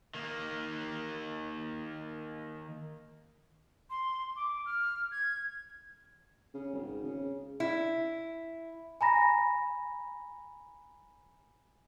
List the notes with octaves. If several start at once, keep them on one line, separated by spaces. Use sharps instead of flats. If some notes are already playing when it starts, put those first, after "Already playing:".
D#3 A#3
C6
D6
F6
G#6
C#3
G#1
C#3
E4
G#5 A#5 B5 A#6